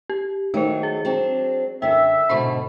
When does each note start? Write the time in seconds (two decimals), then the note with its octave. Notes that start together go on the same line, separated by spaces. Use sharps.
0.10 G4
0.54 D#3 F#3 A3 D#4 C5
0.83 G#4
1.05 F#3 C4 D4
1.82 F#2 D3 E5 G5
2.29 G#2 B2 D3 B5 C#6